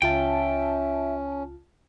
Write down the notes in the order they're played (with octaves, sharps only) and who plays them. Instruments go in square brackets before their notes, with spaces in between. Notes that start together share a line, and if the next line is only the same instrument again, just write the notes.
[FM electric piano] C#2 F4 A5 [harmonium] C#4 [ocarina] E5 [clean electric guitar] G5